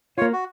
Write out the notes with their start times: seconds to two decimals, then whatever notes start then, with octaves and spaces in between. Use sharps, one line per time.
0.18 F4 C#5
0.22 A#3
0.33 F#4